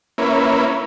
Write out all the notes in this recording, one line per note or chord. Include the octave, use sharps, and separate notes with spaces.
A#3 C#4 E4 B4